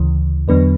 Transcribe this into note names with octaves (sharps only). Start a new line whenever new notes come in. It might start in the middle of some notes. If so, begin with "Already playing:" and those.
Already playing: D2 C#3 E3
E2 D3 F#3 B3 D4 B4